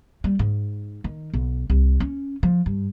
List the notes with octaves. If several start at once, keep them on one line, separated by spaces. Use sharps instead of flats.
G3
G#2
D#3
B1
C2
C#4
F3
G2